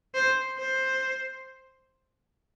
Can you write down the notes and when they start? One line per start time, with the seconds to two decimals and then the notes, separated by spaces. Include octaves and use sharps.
0.15 C5
0.58 C5